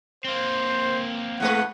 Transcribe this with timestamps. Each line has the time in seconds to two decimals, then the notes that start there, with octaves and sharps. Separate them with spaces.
0.25 A#3 C4 C5
1.40 A2 G#3 B4 F#5